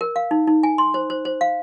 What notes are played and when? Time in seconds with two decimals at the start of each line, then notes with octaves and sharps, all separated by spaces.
0.01 A#4
0.16 F5
0.31 D#4
0.47 D#4
0.63 G#5
0.78 C6
0.94 C5
1.10 C5
1.25 C5
1.41 F5